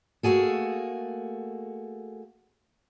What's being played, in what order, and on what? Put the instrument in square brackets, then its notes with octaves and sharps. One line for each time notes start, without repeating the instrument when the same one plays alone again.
[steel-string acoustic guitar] A3 A#3 F#4 G#4 A4